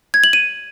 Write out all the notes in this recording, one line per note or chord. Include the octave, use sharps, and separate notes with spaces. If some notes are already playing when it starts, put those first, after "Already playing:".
G#6
F#7
D#7